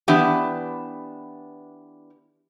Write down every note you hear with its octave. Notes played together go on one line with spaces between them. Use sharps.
E3 B3 D4 G4